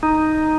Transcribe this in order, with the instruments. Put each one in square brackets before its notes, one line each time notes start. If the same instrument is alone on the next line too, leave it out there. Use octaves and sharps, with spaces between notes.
[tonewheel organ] D#4